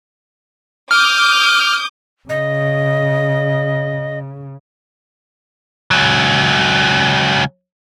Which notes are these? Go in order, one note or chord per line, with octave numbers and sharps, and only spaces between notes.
D6 D#6 F6 G6
C#3 D#5
C#2 F#3